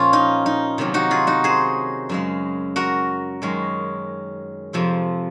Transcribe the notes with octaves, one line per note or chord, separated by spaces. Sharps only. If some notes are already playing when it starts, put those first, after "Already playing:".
Already playing: A#2 F3 A#3 C#4 F4
D#4
D#4
C3 D#3 F#3 A#3 C#4
D#4 F#4
F4 G#4
D#4 F#4
G#4 C5
F#2 C#3 G#3
F#4 A#4
F#2 D#3 G#3 C#4
F2 C3 F3 C4